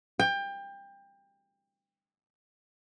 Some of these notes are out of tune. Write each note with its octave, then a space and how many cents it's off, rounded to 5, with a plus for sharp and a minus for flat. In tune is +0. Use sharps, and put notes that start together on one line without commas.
G5 +25